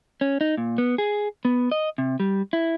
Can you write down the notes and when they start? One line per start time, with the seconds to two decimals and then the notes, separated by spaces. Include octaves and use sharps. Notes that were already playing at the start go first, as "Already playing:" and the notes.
0.21 C#4
0.41 D#4
0.58 A#2
0.78 B3
0.98 G#4
1.45 B3
1.71 D#5
1.98 C3
2.20 G3
2.53 E4